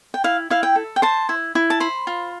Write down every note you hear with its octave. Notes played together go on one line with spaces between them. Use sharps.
G5
E4 F5
E4 F5
G5
A4
G5
C5 A5
E4
E4
A5
C5 B5
F4